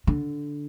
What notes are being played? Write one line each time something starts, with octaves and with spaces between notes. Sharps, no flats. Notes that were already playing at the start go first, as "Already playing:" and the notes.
D3